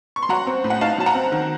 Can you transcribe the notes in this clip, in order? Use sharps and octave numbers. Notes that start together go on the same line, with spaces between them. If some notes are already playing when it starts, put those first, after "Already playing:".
C#6
C6
F#3 F#5 A#5
C4
A2
F#5
D#4 F5 A5
F#3 A5
F#5 A#5
C4
D#3